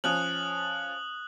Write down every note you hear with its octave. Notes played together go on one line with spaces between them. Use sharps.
F3 C#4 D#6 F#6 F#7